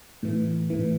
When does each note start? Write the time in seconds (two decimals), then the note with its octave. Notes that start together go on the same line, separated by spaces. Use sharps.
0.23 A2 E3
0.70 A2 E3